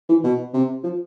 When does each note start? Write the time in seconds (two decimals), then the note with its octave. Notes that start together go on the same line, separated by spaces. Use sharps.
0.09 E3
0.24 B2
0.54 C3
0.84 F3